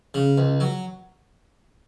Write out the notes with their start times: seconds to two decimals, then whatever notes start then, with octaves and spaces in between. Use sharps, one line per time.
0.14 C#3
0.38 C#2
0.60 F#3